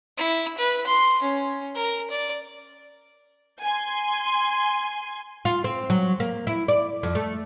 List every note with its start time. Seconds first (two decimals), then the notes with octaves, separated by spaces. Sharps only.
0.18 E4
0.58 B4
0.86 C6
1.22 C#4
1.75 A#4
2.10 D5
3.63 G#5 C6
5.45 F4
5.64 C4
5.90 F#3
6.20 A#3
6.47 E4
6.68 D5
7.03 F2
7.15 A3